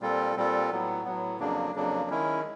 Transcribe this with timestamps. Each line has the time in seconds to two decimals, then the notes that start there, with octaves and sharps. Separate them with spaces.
0.01 A#2 G3 C4 F4 A4
0.36 A#2 G3 C4 F4 A4
0.71 A2 F#3 B3
1.05 A2 F#3 B3
1.40 F2 C#3 F#3 A#3 D4
1.75 F2 C#3 F#3 A#3 D4
2.10 D#3 G#3 C#4 E4